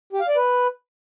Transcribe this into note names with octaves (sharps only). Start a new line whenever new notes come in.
G4
F5
D5
B4